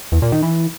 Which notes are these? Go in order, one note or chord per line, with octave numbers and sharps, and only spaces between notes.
E2
A#2
D#3
E3